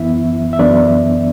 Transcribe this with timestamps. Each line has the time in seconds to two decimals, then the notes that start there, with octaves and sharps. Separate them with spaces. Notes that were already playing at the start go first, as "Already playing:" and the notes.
Already playing: F#2 E3 B3 E4 E5
0.53 E5
0.59 F#2 E3 B3 D4 D5